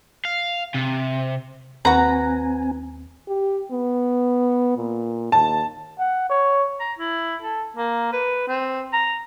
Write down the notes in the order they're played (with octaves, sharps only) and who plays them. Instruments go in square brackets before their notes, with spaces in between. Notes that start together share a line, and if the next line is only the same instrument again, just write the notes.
[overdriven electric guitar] F5
C3
[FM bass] D#2 [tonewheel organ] C4 G#5 [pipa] F#4 B4 [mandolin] A#5
[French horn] G4
B3
A#2
[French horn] D#2 [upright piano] A5
[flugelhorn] F#5
C#5
[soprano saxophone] A#5
E4
A4
A#3
B4
C4
A#5